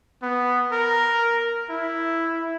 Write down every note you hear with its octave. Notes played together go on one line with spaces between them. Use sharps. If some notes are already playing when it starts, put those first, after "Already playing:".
B3
A#4
E4